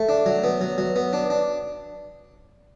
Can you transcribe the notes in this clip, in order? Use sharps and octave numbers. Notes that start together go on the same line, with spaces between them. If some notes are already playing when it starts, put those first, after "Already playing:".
Already playing: A3
D4
F#3
B3
F#3
F#3
B3
D4
D4